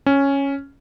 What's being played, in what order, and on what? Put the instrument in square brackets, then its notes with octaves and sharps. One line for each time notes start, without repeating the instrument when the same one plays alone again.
[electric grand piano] C#4